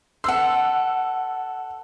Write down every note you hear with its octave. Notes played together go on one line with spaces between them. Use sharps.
A4 B4 F#5 C6 E6